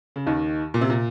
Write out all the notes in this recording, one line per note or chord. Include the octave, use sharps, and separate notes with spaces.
C#3
D#2 D#3
A#2
C3
A#2